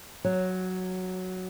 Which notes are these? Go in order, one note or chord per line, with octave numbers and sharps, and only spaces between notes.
F#3